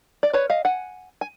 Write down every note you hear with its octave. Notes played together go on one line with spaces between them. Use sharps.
D5
B4 C#5
D#5 F5
F#5 G#5
G#5